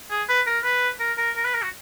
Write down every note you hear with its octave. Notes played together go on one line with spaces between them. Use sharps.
G#4
B4
A#4
B4
A#4
A#4
A#4
B4
A#4
F#4